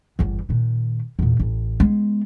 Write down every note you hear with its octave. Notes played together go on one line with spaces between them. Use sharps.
G1 E2
A#2 D#3
E2 A#2
A1
G#3 B3